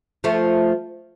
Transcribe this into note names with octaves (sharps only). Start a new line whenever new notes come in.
F3 A3